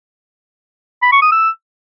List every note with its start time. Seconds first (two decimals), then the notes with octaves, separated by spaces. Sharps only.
1.02 B5
1.12 C#6
1.22 D#6
1.32 E6